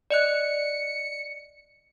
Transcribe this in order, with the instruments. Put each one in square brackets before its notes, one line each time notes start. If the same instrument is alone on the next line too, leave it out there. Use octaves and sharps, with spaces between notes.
[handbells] D5 D#5 F#6 [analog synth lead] C#7